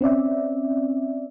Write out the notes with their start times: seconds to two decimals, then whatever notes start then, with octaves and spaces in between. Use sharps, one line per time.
0.01 C4 C#4 D5 E5